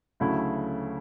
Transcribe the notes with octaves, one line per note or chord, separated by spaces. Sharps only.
D2 C#3 F#3 A3 E4